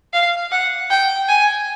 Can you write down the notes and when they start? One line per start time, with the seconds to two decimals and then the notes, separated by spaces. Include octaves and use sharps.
0.13 F5
0.52 F#5
0.90 G5
1.28 G#5